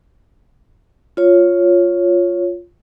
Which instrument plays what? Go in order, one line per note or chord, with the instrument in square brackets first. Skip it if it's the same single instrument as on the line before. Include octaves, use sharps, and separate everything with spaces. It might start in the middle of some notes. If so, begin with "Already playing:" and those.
[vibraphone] F4 C#5